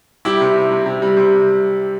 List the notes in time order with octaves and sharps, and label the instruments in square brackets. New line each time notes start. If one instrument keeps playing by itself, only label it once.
[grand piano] G3 E4 G4
C3
C3
C3
C3
G3
C3